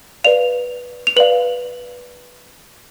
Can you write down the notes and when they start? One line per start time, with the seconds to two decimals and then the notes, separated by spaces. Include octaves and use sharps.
0.24 B4 D5 F5 F7
1.07 F7
1.16 B4 D5 F5 F#7